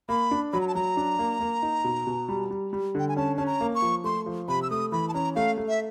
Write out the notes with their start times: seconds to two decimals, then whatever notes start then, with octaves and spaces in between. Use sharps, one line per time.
0.09 A#3 B5
0.31 D4
0.53 F#3 B5
0.61 A#5
0.68 A5
0.75 F#3 A#5
0.97 D4
1.19 A#3
1.41 A#3
1.63 D#4
1.84 B2
2.07 B2
2.29 G3
2.51 G3
2.73 G3
2.95 D3 G5
3.08 G#5
3.17 C#4 A5
3.36 C#4 A5
3.46 A#5
3.61 A#3
3.75 C#6
3.82 F3
4.04 A3 C6
4.26 F3
4.48 C3 B5
4.62 E6
4.71 A3 D#6
4.92 E3 B5
5.09 A5
5.14 C#4 A#5
5.36 A3 F5
5.57 A3
5.68 E5